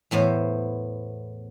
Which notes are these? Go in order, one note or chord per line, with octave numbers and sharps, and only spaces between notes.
E2 A2 B3 C5